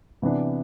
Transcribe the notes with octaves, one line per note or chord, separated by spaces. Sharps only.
C3 E3 B3 D4